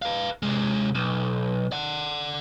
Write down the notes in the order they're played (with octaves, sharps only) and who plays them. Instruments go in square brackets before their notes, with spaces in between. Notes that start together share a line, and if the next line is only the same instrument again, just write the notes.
[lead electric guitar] B4 F5
C3 G#3
B1
D5 F#5